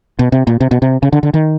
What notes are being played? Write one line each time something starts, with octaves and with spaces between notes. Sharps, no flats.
B2
C3
A#2
C3
B2
C3
C#3
D3
D3
D#3